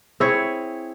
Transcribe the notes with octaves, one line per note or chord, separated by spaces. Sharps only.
C4 E4 G#4 C#5